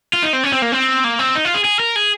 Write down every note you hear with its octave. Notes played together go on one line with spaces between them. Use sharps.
F4
D#4
C4
C#4
C4
A#3
C4
A#3
C4
D#4
F4
G#4
G#4
A#4
G#4